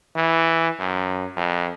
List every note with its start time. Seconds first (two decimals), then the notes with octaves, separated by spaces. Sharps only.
0.16 E3
0.79 F#2
1.36 F2